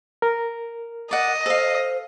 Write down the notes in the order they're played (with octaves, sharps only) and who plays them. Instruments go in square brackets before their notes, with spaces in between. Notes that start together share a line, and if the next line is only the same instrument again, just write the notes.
[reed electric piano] A#4
[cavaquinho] D5 F#5 [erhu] D#5
[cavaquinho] A4 F5 [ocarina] C5